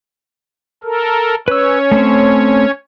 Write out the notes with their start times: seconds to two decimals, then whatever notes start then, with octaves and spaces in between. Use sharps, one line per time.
0.84 A4 A#4
1.48 C#4 B4 C#5 E6
1.92 A3 C4